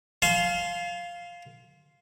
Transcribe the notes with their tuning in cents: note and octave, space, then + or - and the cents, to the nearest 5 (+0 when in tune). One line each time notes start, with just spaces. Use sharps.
F5 +0 A5 -45 C6 +0